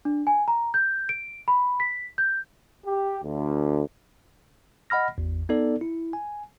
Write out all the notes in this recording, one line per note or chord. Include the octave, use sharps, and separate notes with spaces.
D4
G#5
A#5
G6
D7
B5
B6
G6
G4
D2
D#5 F#5 B5 F6 A#6
G#1 E2
B3 D#4 A4 D5
E4
G#5